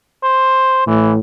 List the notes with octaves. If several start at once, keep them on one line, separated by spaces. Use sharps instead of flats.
C5
A2 E3